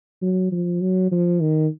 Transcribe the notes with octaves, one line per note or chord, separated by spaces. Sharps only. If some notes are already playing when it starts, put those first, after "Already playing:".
F#3
F3
F#3
F3
D#3